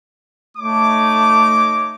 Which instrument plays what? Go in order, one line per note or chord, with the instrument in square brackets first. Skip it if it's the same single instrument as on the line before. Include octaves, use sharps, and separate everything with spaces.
[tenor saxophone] A3 [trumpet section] D#4 C#5 D6